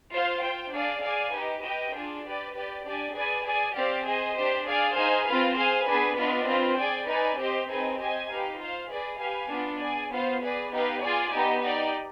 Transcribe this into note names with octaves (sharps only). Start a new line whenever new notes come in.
F4 C5 F5
F4 C5 G5
D4 G#4 D5 F5
G#4 D5 F5 G#5
D#4 G4 B4
G4 B4 D#5 G5
D4 F4 G#4
G4 B4 D5
G4 B4 D5
D4 G4 D5 G#5
G#4 B4 D5 G#5
G#4 D5 G#5
C4 G4 D5 F5
G#4 C5 D#5
D4 G4 C5
G#4 D5 F5
D#4 G#4 C5 F5 G#5
C4 F4 B4 F5
G#4 C5 F5 G#5
B3 D4 G#4 B4
B3 D4 F4 B4 D#5
C4 F4 B4
G#4 D5 G5
D#4 B4 D5 G#5
C4 G4 C5 D#5
C4 D#4 G#4 B4 D#5
G4 C5 D#5 G#5
D#4 G4 B4 F5
F4 C5 F5
G#4 B4 D5
G4 B4 F5 G#5
B3 D4 F4
G#4 D5 G#5
B3 F4 C5 F5
G#4 B4 D5
B3 D#4 G4 B4 F5
F4 G#4 D5 G#5
B3 D#4 G4
D#4 G4 D5